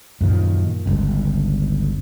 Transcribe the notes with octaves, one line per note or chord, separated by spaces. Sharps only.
F#2 A#2 D#3 F3
G1 C#2